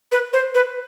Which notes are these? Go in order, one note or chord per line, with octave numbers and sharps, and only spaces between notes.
B4
C5
B4